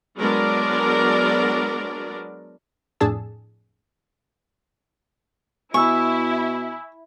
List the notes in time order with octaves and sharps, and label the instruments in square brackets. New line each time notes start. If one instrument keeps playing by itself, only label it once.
[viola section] F#3 G#3 B3 D4 A#4 D5
[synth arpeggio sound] F2 A2 D4 G#4 A5 E6
[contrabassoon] B2 [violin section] E4 [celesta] G#5 E6 [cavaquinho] C#6